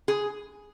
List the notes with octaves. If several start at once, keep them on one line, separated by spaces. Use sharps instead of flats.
G#4